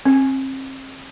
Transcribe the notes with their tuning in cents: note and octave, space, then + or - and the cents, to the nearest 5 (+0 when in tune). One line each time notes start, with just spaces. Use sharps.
C4 +35